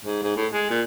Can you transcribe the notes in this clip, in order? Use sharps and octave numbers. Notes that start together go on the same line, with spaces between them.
G#2
G#2
A2
G#3
A#2